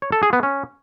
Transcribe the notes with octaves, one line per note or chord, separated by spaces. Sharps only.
C#5
A4
G#4
B3
C#4